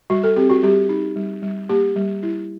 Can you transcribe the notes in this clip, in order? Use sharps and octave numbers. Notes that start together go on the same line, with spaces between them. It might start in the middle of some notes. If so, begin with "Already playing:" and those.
G3 F#4
A4
C4 G4
F#4
G3 G4
D#4
G3
G3
A#3 G4
G3
E4